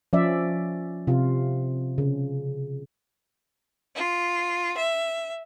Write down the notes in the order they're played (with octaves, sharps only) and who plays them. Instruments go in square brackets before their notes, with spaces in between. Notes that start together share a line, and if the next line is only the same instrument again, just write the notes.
[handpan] F3 C#4 D5 E5
C3 F4
C#3
[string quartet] F4
E5